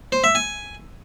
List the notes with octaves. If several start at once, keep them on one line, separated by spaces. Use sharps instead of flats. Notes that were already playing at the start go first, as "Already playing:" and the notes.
C5
E5
G#5